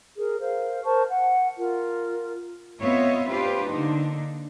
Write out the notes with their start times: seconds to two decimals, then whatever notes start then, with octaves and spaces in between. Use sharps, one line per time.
0.17 G#4 A#4
0.40 A#4 C5 F5
0.84 A#4 C5 A5 C#6
1.09 F#5
1.58 F4 A#4
2.80 B3 C4 F4 C#5 D#5 E5
3.30 D4 F4 G4 B4 C5
3.70 D3 A#3 D4 D#4